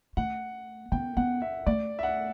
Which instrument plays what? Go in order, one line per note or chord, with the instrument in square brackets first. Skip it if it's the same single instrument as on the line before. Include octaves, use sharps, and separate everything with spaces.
[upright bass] A3 [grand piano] F#5
[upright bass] B3 [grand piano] G5
[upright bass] B3 [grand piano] F#5
[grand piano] E5
[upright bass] A3 [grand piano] D5
[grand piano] E5
F#5